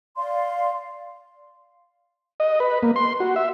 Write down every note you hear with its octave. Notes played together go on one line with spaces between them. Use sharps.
D5 F5 C6
D#5
B4
A#3
C6
F#4
E5